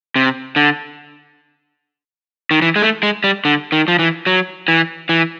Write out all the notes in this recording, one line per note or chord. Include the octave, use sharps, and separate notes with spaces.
C3
D3
D#3
E3
G#3
A3
G#3
G3
D3
D#3
F3
E3
F#3
E3
E3